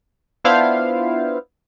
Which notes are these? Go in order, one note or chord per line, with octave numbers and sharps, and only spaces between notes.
B3 D4 E4 F4 C5 F5